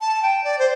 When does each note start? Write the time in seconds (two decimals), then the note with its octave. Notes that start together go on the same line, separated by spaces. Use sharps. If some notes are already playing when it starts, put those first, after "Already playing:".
0.01 A5
0.22 G5
0.44 D5
0.59 C5